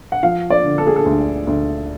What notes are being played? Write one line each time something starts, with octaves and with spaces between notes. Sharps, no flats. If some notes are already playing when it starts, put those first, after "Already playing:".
F#5
F3 F5
D5
D3
A4
G#4
A4
D2
D2